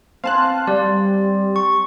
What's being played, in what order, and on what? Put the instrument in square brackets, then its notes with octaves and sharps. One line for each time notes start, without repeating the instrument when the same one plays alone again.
[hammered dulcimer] C4 G#5 C6 [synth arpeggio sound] F5 A5 F#6
[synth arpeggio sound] G3 [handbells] D5
[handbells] C#6